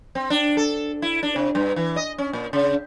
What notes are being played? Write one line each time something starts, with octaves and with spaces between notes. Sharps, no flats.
C4
D4
A4
E4
D4
C3
G2
E3
D#5
C#4
A#2
C#3